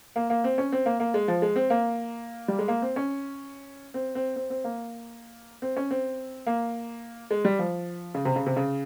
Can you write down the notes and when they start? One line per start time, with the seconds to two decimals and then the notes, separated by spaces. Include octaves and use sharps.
0.16 A#3
0.30 A#3
0.44 C4
0.58 C#4
0.72 C4
0.86 A#3
1.00 A#3
1.14 G#3
1.28 F3
1.42 G#3
1.56 C4
1.70 A#3
2.48 G3
2.59 G#3
2.68 A#3
2.82 C4
2.96 C#4
3.94 C4
4.15 C4
4.36 C4
4.50 C4
4.64 A#3
5.62 C4
5.77 C#4
5.91 C4
6.47 A#3
7.31 G#3
7.45 G3
7.59 F3
8.15 C#3
8.25 C3
8.36 C#3
8.46 C3
8.56 C#3